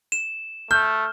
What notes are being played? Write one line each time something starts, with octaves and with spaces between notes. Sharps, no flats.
E7
A3 F6 G6